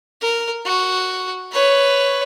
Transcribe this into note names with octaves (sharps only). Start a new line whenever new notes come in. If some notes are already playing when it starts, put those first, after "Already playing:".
A#4
F#4
B4 C#5